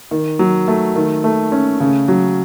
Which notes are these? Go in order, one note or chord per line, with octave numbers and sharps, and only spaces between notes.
D#3
F#3
A3
D#3
A3
C#4
C#3
F#3